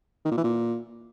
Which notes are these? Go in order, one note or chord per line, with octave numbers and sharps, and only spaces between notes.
D#3
A#2
E3
A#2